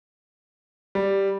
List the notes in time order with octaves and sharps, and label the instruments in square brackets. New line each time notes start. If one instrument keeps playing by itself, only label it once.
[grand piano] G3